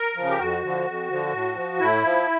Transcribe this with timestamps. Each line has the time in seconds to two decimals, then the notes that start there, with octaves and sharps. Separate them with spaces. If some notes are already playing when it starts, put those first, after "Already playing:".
Already playing: A#4
0.16 C#3 F3
0.30 G4
0.39 F2 F#4
0.62 D3 F3
0.86 F2
1.10 D3 F3
1.33 A2
1.56 F3
1.80 A2 E4
2.04 F3